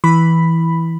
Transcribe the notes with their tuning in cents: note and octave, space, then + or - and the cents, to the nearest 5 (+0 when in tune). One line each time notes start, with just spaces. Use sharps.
E3 -5 B5 +0